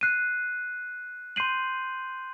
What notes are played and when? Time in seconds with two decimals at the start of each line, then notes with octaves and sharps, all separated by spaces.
0.01 F#6 C7 D#7
1.36 C6 G6 C7 D#7 F#7